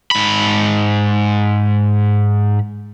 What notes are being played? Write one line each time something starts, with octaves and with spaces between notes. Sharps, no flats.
G#2 B5